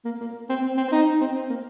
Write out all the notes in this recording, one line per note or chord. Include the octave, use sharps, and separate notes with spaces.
A#3
A#3
C4
C4
C4
C4
D#4
C4
C4
A#3